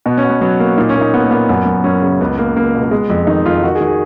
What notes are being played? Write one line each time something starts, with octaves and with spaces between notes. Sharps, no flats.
B2 B3
C#4
B2
B3
F#3 B3
A#3
A#2 D#4
C#4
A#2
D#4
A#3 B3
A#3
A#2 B3
F#2 B3
F#2
F#2 C#4
C#3
C#2 B3
A#3
C#2 A#3
B2
A#3
G#3 B3
F2
D#3 D#4
F2 F4
D#3 F#4
G#4
D#3
G#4